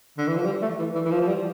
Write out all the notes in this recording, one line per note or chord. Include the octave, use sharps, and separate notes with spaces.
D3
E3
F3
G3
A3
E3
E3
E3
F3
F3
G3